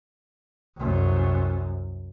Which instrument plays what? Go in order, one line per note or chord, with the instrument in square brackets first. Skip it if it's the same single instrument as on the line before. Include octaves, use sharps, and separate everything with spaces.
[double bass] C2 F#2